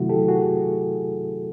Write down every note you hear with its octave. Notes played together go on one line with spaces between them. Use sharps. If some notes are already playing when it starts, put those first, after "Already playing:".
Already playing: C3 D#3 F#3 A3 E4 F#4
G4 A4
F#4 G#4